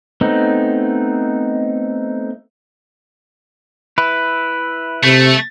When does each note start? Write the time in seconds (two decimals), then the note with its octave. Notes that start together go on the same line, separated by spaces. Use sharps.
0.21 A3 B3 C4 D#4
3.98 E4 B4
5.04 C3 A3